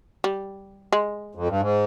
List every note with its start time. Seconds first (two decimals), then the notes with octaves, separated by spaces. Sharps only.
0.24 G3
0.93 G#3
1.35 F2
1.48 G2
1.61 G#2